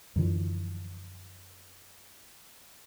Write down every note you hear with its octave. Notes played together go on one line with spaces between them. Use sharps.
F#2 D3 E3 F3